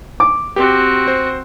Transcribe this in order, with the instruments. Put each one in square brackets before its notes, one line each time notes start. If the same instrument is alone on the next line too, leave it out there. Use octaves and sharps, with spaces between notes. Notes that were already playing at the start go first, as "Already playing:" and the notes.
[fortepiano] D6
[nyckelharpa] C4 F#4 [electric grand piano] G4
[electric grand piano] C5